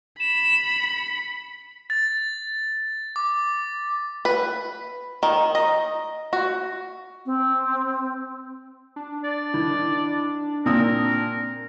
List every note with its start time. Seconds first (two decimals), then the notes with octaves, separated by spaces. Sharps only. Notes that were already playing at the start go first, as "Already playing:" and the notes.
0.19 B5 E7
0.65 C#7
1.90 A6
3.16 D6
4.25 B4
5.23 D#3
5.55 D#5
6.33 F#4
7.26 C4
8.96 D4
9.24 D5
9.54 D#3 E4
10.66 A#2 C4 A#4 D#6 E6